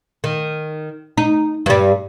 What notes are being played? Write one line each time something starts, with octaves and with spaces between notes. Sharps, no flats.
D#3
D#4
G2 G3